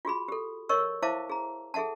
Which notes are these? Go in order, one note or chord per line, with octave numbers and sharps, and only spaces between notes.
F4 F#4 G#4 B5
G4 A4
A#4 C#5 D#5 C#6 E6
E4 C5 E5 F5 A5 D6
G#4 A#5
G#4 A4 E5 F#5 A5